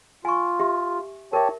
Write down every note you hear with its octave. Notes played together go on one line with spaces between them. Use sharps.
F4 G#5 C#6
G4 E5
G4 A#4 C#5 E5 A5